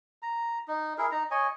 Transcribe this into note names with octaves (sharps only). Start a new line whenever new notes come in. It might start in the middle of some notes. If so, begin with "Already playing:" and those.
A#5
D#4
E4 G#4 A#4
D#4 A#5
C#5 D#5 G#5